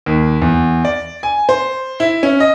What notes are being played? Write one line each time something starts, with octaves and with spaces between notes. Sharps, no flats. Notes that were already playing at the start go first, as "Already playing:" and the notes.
D#2
E2
D5
G#5
C5
E4
C#4
D#5